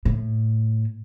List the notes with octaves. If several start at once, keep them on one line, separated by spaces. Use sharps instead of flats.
A2